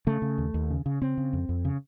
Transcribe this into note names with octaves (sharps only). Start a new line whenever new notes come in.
C#3 A3
C#3
D#2
D#2
C#3
C#3
C#3 C4
C#3
F2
F2
C#3